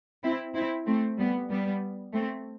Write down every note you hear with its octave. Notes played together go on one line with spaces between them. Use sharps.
C4 E4
C4 E4
A3 C4
G3 B3
G3 B3
A3 C4